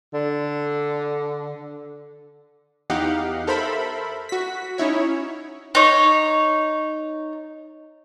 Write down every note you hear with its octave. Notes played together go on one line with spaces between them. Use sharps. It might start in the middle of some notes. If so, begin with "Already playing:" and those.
D3
E2 D#4 G4 F5 F#5
A4 A#4 C5 E5 B5
F#4 B6
C#4 D#4 E4 C#5
D#4 C#5